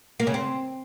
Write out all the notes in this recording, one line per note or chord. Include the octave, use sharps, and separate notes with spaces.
A#3
C#3
C4